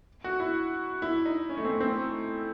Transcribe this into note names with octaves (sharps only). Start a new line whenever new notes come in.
F#4
E4
E4
D#4
C#4
A3
C4
C4